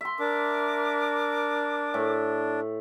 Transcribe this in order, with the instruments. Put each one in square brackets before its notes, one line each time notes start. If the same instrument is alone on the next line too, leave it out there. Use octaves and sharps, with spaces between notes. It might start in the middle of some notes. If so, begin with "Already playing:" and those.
[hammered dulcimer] E5 C6
[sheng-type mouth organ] D4 [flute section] A#4 D6
[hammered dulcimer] A2